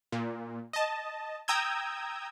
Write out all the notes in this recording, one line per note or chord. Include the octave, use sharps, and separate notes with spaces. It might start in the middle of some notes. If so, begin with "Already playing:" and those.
A#2
D#5 A5
G5 A#5 D#6 E6 G6 G#6